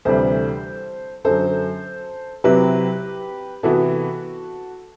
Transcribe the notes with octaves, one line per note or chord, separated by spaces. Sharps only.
D2 C3 E3 G3 A4 C5
F#2 D3 F#3 A4 C5
C3 F#3 C4 E4 G4 B4
C3 E3 B3 E4 F#4 A4